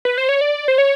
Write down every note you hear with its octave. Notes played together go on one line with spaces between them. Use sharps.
B4
C5
C#5
D5
C5
C#5